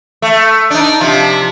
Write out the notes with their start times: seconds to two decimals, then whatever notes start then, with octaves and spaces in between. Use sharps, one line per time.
0.22 A3
0.70 D4 D#4
1.01 C3 F3